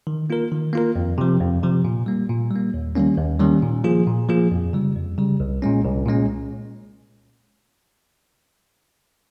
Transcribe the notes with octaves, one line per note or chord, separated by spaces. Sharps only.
D#3
A#3 F4 A#4
D#3
A#3 F4 A#4
F2
C3 F3
F2
C3 F3
A#2
G3 A#3
A#2
G3 A#3
D#2
D#3 G3 A#3 C#4
D#2
D#3 G3 A#3 C#4
A#2
F3 A#3 F4 G#4
A#2
F3 A#3 F4 G#4
F2
C#3 G3
F2
C#3 G3
C2
A#2 G#3 C#4
C2
A#2 G#3 C#4